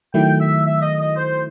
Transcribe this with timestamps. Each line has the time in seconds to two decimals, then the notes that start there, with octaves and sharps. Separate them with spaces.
0.14 D#3 F#3 A3 E4 G5
0.40 E5
0.65 E5
0.82 D#5
1.00 D#5
1.16 C5